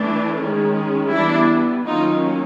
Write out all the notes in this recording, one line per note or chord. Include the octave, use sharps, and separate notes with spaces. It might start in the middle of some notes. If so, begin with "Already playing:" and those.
Already playing: E3 A3 D4
D#3 G#3 C#4
E3 G3 B3 D4 E4
D#3 F#3 A#3 C#4 D#4 F4